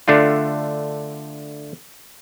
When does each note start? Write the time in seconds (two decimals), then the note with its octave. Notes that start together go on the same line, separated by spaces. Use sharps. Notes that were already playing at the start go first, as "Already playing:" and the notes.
0.08 D3 A3 D4 F4